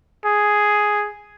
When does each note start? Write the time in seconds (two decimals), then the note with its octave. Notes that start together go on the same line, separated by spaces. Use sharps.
0.25 G#4